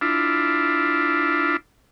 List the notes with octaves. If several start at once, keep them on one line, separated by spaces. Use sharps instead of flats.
D4 E4 F4